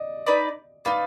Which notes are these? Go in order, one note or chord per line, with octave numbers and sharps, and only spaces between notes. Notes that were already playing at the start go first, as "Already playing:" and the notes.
Already playing: D5 D#5
D#4 B4 D5
D#4 B4 D5 F5